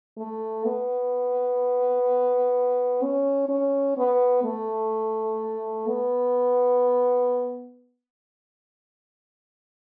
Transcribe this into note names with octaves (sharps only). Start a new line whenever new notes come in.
A3
B3
C#4
C#4
B3
A3
B3